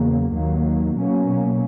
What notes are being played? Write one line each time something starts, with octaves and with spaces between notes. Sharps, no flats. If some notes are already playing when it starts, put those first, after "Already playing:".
Already playing: E2 C#3 F#3 A#3
D#2 D#3 F#3 A#3
B2 F#3 A#3 C#4